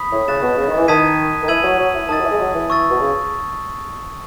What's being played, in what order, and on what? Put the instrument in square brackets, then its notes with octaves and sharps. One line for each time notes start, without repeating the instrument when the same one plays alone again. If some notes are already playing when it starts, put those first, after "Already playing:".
Already playing: [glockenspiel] B5 D#6 B6
[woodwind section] A2
[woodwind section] C#3 [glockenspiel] F#6 A6 E7
[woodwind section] B2
C#3
D#3
E3
[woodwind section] D#3 [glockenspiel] A5 D#6 G#6 B6 D#7
[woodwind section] D#3
[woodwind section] E3 [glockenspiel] E6 G#6 D#7 F#7
[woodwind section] F#3
F#3
E3
[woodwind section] D#3 [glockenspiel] A5 D#6 A6
[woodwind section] F#3
E3
G#3
F#3
E3
[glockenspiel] C#6 E6 A6
[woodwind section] B2
C#3